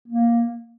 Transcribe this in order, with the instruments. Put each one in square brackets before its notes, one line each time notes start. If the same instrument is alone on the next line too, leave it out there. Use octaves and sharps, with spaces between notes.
[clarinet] A#3